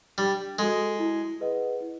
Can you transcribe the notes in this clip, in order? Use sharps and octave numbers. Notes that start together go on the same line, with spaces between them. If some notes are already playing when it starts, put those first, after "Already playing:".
G3 D4
G#3 F#4 A4
E4
G#4 B4 D#5 F#5
E4